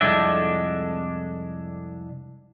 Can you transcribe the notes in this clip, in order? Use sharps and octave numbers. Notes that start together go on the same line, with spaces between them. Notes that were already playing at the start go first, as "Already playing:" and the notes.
C2 F2 G#3 D4 A4 E5